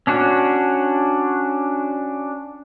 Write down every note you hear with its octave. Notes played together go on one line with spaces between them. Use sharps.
C#4 D4 F#4 C#5